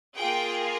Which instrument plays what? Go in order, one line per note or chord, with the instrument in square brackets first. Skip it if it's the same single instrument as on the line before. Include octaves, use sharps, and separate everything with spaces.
[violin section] A#3 F4 G#4 G5